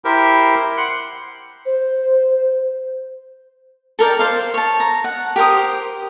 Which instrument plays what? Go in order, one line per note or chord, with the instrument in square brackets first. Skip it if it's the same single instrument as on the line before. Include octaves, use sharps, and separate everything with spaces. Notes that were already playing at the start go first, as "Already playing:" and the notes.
[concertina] E4 G4 A#4 C5
F#5 C6
[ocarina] C5
[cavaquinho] A4 A#4 D5 G5
C5 F5
C#5 A5
A#5
F#5
G4 A#4 C5 D#6